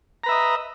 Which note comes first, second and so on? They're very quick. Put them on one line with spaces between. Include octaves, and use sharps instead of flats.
A#5 B4 E5 D#5